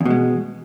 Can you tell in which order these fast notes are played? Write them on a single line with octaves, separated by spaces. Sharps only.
E2 B2 G#3